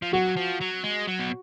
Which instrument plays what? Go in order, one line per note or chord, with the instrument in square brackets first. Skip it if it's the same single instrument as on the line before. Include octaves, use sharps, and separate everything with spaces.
[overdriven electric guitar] F3
[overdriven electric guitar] F#3 [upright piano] F#4
[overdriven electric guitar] F3
F#3
G#3
F#3
B2